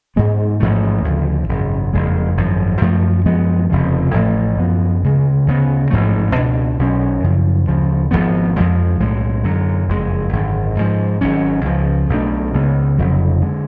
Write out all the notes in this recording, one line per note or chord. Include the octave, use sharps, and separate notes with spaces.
G#2 G#3 B3
A1 G#2 F3 A3
D2 C#3 F3
G#1 F#2 C#3
F#1 F2 C#3 G#3
G#1 F#2 F3
F#2 F3 A3
F#2 F3 G#3 B3
F1 F2 C#3 F3
A1 A2 F3 A3
F#2 F3 B3
D2 C#3 G#3
D2 C#3 G#3 B3
A1 G#2 F3 A3
C#2 B2 A3 D4
B1 B2 F#3 C#4
F#2 C#3 F3
D2 C#3 F3
G#1 F#2 F3 B3
F2 F3 G#3
B1 A2 G#3
F#2 D3 F#3
F#1 F2 C#3 G#3
G#1 F#2 D3
G#2 F3 G#3
G#1 G#2 F#3 C#4
C#2 C#3 F3
B1 B2 A3 D4
C#2 C#3 G#3 B3
F1 F2 C#3 F#3
D3 G#3